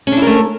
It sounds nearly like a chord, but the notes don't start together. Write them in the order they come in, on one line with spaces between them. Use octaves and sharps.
C#4 D4 E4 A#4 A3